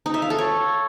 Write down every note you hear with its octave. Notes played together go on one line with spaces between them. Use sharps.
D#4
E5
F5
A4
C#5